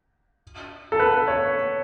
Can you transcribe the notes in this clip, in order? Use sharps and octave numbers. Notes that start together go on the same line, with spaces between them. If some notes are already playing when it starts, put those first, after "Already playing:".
A4
B4
C#5